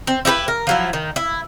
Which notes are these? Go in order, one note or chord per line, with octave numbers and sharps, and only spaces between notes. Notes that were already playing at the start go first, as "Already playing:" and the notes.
C4
E4 G4 G#4 B4
A#4
F3 F#3 E4
D#3
E4